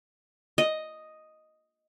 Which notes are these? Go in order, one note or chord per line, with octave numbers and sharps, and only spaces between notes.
D#5